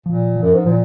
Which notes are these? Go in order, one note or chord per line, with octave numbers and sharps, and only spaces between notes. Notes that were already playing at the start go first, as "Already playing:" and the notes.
A#2 F3
F3
F#2
G#2
A#2 F3